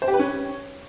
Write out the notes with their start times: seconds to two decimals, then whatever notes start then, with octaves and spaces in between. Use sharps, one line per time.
0.02 C5
0.08 G4
0.14 B4
0.19 C#4